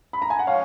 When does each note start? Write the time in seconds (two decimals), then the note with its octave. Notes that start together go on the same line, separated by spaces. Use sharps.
0.13 B5
0.22 A#5
0.30 G#5
0.39 F#5
0.47 F3 G#3 C#4 C#5 F5